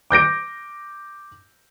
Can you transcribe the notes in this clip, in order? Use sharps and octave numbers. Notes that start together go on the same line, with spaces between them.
D6 G6 A#6 D7